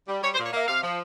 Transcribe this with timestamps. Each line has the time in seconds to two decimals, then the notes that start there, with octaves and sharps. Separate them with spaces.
0.08 G3
0.23 G3 C#5
0.35 C5
0.38 A#2
0.46 C#5
0.53 A#3 E5
0.68 C3 F5
0.83 F3